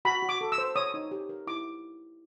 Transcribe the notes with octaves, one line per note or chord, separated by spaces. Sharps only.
F#4 B5
F#4
D6
A4
E6
C5
C#5 D#6
D#4
G4
A#4
E4 D6